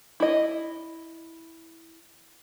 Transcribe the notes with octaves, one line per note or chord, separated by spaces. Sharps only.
E4 D#5